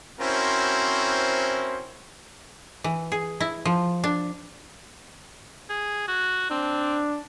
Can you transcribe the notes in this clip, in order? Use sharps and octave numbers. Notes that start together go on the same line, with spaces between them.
C4 C#4 E4 F#4 A#4 C5
E3
G#4
E4
F3
D4
G#4
F#4
C4 D4